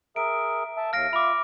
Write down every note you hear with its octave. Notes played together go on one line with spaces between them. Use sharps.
G#4 A#4 E5 D7
E5 A5 E6
D#2 F5 F6 A#6 D7
F4 E5 B5 D6